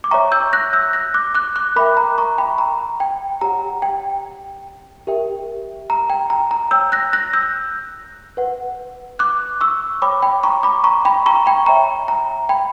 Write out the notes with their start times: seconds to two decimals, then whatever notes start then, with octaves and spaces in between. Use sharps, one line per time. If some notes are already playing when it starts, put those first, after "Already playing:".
0.04 D6
0.11 C#5 E5 G5 A#5 C#6
0.32 E6 G6
0.53 F#6 A#6
0.73 E6 G6
0.93 F#6 A#6
1.14 D6 F#6
1.35 D6 F#6
1.56 D6 F#6
1.76 A#4 E5 G5 B5 D6
1.97 A#5
2.18 A#5 C#6
2.38 G5 B5
2.58 A#5
3.00 G5
3.41 G4 C#5 F#5 A#5
3.82 G5
5.07 G4 A#4 E5 G5
5.90 A#5
6.10 G5
6.30 A#5
6.51 A#5
6.71 C#5 G5 E6 G6
6.92 F#6 A#6
7.13 F#6 A#6
7.33 E6 G6
8.37 B4 F#5
9.19 D6 F#6
9.61 C#6 E6
10.02 C#5 G5 B5 D6
10.22 G5 B5
10.43 A#5 C#6
10.63 B5 D6
10.84 A#5 C#6
11.05 G5 B5
11.26 A#5 C#6
11.46 G5 B5
11.66 C#5 E5 G5 A#5
12.08 A#5
12.49 G5 B5